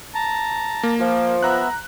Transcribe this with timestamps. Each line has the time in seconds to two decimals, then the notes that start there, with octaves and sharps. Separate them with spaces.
0.14 A5 A#5
0.83 A#3
0.99 F3
1.43 B3 E5 A#5 F#6